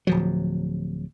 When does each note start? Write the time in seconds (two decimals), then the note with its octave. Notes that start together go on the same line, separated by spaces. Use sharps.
0.07 D1 F3 F#3